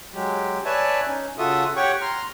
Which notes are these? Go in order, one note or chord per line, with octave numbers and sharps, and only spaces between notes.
F#3 G#3 G4
B4 C#5 D5 E5 G#5 A5
C#4 D#4
C#3 F4 F#4 A4 E5 D#6
G4 C#5 F#5 G5 C#6
A#5 C6 F6